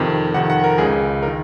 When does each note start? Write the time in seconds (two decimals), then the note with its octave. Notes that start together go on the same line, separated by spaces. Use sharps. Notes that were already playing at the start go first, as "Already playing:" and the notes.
Already playing: F2 C3 D#3
0.34 F2 C3 D#3 F#5
0.50 F#5
0.64 A#4
0.78 C#2 C#3 G#4
1.23 A#4
1.27 D#3